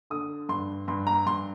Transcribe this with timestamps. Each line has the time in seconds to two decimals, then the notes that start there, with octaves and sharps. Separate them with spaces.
0.10 D3 D#6
0.49 G2 C6
0.88 G2 C6
1.07 A#5
1.26 G2 C6